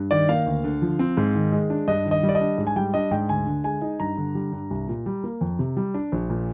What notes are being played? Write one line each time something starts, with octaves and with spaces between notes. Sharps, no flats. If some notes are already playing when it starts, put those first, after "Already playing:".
Already playing: G2
D#3 D5
A#3 F5
D2
D3
F3
C4
G#2
D#3
G#3
D4
G2 D#5
D#3
D#5
G3
D5
D#5
D4
G#2
G#5
G3 G5
D4 D#5
G#2 G5
D2 G#5
D3
G#3 G#5
D#4
G2 A#5
D3
G3
G2
C2
A#2
G3
A#3
F2
C3
G3
D4
A#1
A#2